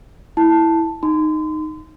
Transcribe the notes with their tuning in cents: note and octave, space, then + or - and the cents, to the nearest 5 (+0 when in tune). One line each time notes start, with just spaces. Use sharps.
E4 -5 A5 +5
D#4 -10 C6 -35